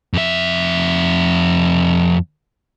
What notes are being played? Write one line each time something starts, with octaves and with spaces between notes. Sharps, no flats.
F2 E5